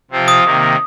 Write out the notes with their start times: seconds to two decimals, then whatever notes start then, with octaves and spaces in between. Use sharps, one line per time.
0.11 C3 F3 C4 F4
0.28 D#6
0.44 C3 D#3 A#3